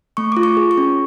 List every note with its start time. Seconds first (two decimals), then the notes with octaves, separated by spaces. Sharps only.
0.17 A3 C#6
0.32 F4 D6
0.43 C#6
0.57 G#4
0.71 C#6
0.78 C#4